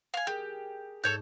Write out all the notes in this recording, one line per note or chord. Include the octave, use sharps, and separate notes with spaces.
F5 G#5
G4 G#4 A#4
G#2 A4 C#5 G6